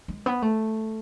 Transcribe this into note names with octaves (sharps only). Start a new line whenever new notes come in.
G#3
B3
A3